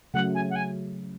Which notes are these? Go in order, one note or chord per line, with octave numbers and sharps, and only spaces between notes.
C#3 F#3 A3 F#5
G#5
F#5
G#5